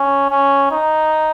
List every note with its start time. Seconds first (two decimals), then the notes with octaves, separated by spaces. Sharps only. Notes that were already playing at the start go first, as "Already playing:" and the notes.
Already playing: C#4
0.31 C#4
0.71 D#4